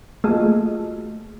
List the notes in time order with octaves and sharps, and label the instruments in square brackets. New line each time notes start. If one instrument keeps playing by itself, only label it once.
[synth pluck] A3 A#3 F4 F#4 G#4 D#5